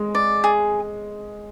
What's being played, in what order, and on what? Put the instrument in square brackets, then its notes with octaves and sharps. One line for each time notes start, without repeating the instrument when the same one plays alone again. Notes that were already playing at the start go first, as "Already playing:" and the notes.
Already playing: [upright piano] G#3
[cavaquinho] D5
G#4